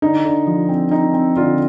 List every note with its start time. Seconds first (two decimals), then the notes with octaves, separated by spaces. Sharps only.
0.02 D3 D#4
0.25 D3
0.47 F3
0.69 C4
0.91 C4 D#4
1.13 C4
1.37 D3 F4